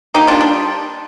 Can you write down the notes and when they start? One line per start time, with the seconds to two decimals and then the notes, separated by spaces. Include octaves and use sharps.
0.14 A#3 D#4 G4
0.27 G3 D4 F4
0.41 D4